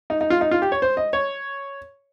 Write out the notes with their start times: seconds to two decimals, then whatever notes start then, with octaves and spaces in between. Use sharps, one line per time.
0.10 D#4
0.21 D#4
0.30 F4
0.41 D#4
0.51 F4
0.62 G4
0.72 C#5
0.82 C5
0.97 D#5
1.13 C#5